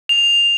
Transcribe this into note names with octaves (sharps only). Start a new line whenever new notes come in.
F7